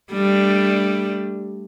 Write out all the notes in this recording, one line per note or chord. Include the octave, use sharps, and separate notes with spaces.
G3 A3 D4